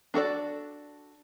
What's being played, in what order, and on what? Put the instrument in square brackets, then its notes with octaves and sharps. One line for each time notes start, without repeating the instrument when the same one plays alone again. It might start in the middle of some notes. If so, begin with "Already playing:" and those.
[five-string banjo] D4 F#4 A4 D5